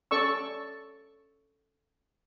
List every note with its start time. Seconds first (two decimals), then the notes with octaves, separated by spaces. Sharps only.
0.11 C#4 A4 D5 C#6 E6